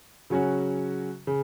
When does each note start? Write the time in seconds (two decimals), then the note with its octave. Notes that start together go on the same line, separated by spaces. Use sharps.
0.30 C#3 F#3 C#4 F#4
1.27 C#3